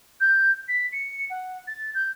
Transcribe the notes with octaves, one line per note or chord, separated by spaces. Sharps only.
G6
B6
C#7
F#5
A6
G6